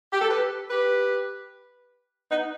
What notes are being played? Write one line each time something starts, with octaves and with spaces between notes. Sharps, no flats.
G4
A4
G4 B4
G4 B4
B3 D#4